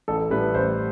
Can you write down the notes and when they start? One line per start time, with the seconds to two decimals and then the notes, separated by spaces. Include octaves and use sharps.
0.08 A1 A4
0.30 A2 G3 B4
0.54 A1 C5